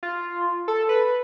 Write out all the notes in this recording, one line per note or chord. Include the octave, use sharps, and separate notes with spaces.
F4
A4
B4